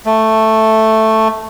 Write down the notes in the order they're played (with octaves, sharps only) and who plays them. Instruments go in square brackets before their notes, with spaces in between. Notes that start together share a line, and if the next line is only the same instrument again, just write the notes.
[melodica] A3